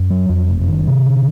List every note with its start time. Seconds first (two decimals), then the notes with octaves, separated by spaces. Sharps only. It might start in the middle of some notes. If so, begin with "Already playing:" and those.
Already playing: F#2
0.10 F#3
0.29 F2
0.49 F#1
0.68 D#3
0.87 C3
1.06 D3